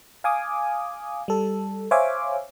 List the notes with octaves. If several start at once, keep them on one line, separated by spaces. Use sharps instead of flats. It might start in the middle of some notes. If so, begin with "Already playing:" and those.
F5 G#5 D6 D#6
G3 A4
C5 C#5 E5 F5 G#5 D6